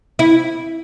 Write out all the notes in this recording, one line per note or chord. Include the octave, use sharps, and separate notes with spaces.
E4